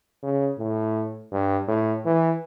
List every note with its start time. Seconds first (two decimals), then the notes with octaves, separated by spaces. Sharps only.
0.23 C#3
0.58 A2
1.32 G2
1.68 A2
2.05 E3